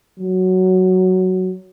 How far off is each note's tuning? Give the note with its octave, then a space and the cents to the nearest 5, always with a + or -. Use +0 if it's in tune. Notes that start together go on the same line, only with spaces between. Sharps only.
F#3 +5